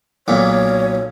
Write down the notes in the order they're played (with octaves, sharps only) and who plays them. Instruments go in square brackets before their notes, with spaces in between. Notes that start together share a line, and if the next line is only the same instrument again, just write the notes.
[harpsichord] B1 A#2 [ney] C#5